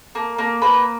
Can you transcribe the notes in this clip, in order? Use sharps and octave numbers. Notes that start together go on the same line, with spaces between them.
A#3
A#3
A#3 B4